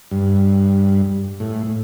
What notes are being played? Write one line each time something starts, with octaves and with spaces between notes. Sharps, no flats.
G2
A2